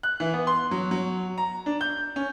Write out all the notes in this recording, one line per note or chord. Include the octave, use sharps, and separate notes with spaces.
F#6
E3
B3
C6
F#3
F#3
A#5
D4
G6
C#4